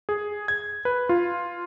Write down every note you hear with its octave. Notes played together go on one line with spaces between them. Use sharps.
G#4
G#6
B4
F4